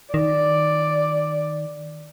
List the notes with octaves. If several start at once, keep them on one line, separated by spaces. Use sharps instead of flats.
D#3 D5